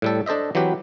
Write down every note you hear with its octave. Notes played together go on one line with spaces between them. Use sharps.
A2 G3 A4
D4 A4 C5 D#5 E5
E3 F#3 C4 G4 B4